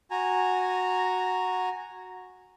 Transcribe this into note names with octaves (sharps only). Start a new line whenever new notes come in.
F#4 G#5 A#5